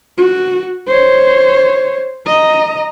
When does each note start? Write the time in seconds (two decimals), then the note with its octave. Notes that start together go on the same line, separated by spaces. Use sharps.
0.18 F#4
0.87 C5 C#5
2.27 D#5 A#5